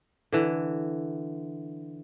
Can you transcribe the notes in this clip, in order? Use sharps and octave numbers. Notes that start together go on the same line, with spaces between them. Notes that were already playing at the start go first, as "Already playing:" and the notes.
D3 E3